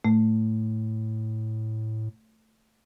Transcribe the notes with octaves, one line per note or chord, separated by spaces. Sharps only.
A2 A3